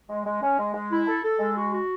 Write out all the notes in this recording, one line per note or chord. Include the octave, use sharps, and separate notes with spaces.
G#3
G#3
C#4
G#3
G#3
E4
A4
A4
G#3
F#4
F#4